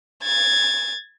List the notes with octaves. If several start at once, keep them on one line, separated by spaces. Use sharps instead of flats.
G#6 A6